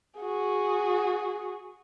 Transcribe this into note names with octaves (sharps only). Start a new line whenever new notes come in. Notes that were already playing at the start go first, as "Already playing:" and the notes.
F#4 G#4